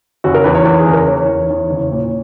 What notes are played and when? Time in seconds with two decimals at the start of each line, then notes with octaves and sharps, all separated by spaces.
0.24 F#1 F#4
0.34 A#4
0.44 E2 B4
0.55 C#5
0.65 E2 B4
0.79 G#4
0.87 F#1
0.93 A#4
1.08 E2 C#5
1.29 E2
1.50 E2
1.70 F#1
1.92 A#2